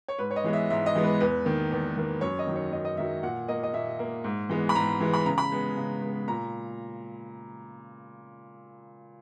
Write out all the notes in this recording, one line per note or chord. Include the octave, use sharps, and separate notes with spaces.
C#5
G#2 B4
C#5
D#5
E3 G#3 B3
E5
G#2 E5
D#5
E3 G#3 B3
B4
E2 B4
D#3 A#3
E2
D#3 A#3
F#2 C#5
D#5
D#3 F#3
C#5
F#2 D#5
D#5
D#3 F#3 E5
A#2 F#5
A#3 D#5
D#5
A#2 E5
A#3
G#2
E3 G#3 B3
B5
G#2 A#5
E3 G#3 B3
B5
C#3 A#5
B5
G#3 B3
C#3
G#3 B3
A#2 A#5